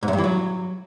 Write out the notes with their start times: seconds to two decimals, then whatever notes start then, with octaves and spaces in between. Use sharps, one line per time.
0.03 G#2
0.08 F#2
0.13 G2
0.18 E3
0.24 F#3